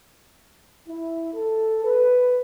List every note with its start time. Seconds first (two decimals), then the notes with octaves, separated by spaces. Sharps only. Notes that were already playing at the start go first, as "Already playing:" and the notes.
0.88 E4
1.34 A4
1.83 B4